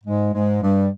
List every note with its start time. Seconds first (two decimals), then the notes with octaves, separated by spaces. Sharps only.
0.04 G#2 G#3
0.33 G#2 G#3
0.62 G2 G3